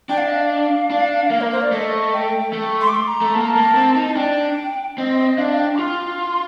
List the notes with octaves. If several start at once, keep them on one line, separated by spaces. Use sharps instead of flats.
D4 G5
F5
D#5
F5
D4
A#3
A#4
C5
D5
A3 D#5
G5
A3
C6
D6
C6
A#5
A3
A#3 A5
A#5
A5
A#3
C4
D#4
A5
D4 G5
C4 D#5
D#5
D4 F5
F5
G5
D6
F4 C6